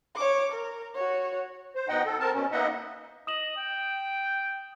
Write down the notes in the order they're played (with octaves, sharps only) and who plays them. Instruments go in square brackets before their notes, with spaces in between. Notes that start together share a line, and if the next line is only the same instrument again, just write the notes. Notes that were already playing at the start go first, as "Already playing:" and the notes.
[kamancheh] C#5 D6
A#4
F#4 C#5
[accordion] C5
B2 D#4 D#5 F#5 G5
A4
C4 A#4 A5
B2 C#4
A#3 B3 D#4 D#5 E5 F#5
[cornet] D#5 [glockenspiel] D#6 E7 F#7
[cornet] G5